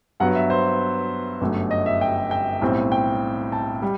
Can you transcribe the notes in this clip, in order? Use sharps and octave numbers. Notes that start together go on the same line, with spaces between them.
G2 F#3 B3 F#5
E5
C5
G1 F#2 F#3 A3
D#5
E5
G5
G5
B1 A2 G3 C4
G5
A5
G3